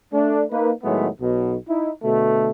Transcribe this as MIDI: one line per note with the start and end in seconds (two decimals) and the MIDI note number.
0.12 0.43 57
0.12 0.43 62
0.52 0.71 58
0.52 0.71 63
0.52 0.71 71
0.84 1.08 45
0.84 1.08 51
0.84 1.08 54
0.84 1.08 56
0.84 1.08 57
0.84 1.08 59
1.21 1.55 35
1.21 1.55 47
1.68 1.90 63
1.68 1.90 64
2.03 2.50 47
2.03 2.50 50
2.03 2.50 57